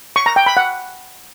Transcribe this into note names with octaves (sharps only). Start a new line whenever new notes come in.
C#6
A#5
G5
B5
F#5